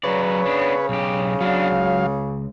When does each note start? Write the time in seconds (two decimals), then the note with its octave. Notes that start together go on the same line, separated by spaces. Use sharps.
0.04 C#3 F#3 B4 C#5 D5
0.46 B3 D4
0.89 B1 G4
1.41 F#3 B3 D4 F5
1.72 C#2